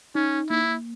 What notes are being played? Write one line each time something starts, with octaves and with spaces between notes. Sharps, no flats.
C#4 D#4
A#3 E4